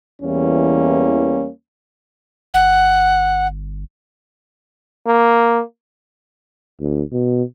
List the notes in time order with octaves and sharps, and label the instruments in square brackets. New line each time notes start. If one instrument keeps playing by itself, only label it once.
[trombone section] E2 E3 G3 A#3 C#4
[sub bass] G1 [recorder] F#5
[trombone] A#3
[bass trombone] D2
B2